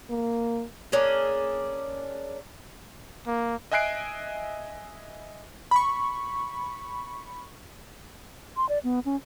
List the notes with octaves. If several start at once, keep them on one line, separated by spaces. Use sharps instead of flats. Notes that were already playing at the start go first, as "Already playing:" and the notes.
A#3
A#3 C#4 D4 G#4
A#3
D#5 E5 G#5 F#6 C7 D7
B5 C#6
C6
D5
B3
C#4